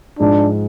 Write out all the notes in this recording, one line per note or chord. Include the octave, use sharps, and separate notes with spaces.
G#2 F3 G#3 D4